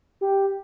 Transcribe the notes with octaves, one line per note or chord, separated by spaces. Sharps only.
G4